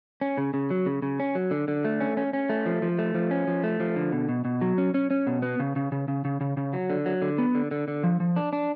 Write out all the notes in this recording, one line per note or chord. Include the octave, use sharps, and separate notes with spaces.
C#4
C#3
C#3
F#3
C#3
C#3
C#4
F#3
D3
D3
A3
C#4
C#4
C#4
A3
F3
F3
A3
F3
C#4
F3
A3
F3
D3
B2
B2
B2
F#3
C#4
C#4
C#4
B2
B3
C#3
C#3
C#3
C#3
C#3
C#3
C#3
F#3
D3
F#3
D3
B3
D3
D3
D3
F3
F3
D4
D4